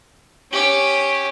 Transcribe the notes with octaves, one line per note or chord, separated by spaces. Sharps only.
C#4 G4